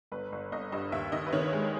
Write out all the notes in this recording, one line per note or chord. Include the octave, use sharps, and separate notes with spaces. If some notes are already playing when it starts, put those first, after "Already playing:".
G1 B4
G1
G1 D#5
G2 D#5
D#2 E5
D#3 D#5
B4
D#3 C#5
G#3